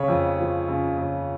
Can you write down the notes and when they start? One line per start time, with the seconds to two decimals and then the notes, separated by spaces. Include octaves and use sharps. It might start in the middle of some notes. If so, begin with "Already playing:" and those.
Already playing: C#3 C#5
0.08 F2
0.39 F3
0.68 C#3
0.98 C#3